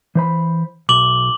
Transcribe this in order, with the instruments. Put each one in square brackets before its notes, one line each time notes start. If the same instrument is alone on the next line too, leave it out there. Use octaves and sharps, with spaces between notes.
[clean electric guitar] E3 C5 B5
[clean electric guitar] B1 [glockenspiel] D6 F#7 G7